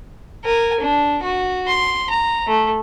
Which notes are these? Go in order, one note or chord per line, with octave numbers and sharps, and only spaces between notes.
A#4 G#5
D4
F#4
C6
A#5
A3